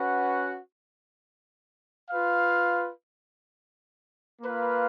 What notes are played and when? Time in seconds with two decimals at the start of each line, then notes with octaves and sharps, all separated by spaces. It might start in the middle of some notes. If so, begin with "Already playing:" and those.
Already playing: C#4 F#4 B4 F#5
2.09 F4 B4 F5
4.41 A#3 F4 B4 F5